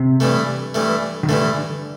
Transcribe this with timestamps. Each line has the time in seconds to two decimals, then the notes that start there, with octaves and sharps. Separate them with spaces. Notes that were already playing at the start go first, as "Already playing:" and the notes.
Already playing: C3
0.20 G2 E3 A3
0.74 G2 E3 A3
1.23 D#3
1.29 G2 D3 E3 A3